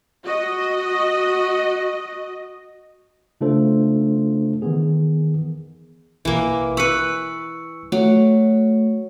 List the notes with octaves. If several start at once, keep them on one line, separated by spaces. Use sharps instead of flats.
F#4 D#5
C#3 A3 D4 F4 A4 C5
D#3 E3 B3 G#4
A1 B2 E3 A#3
B4 B5 C#6 E6 C#7
F#3 A3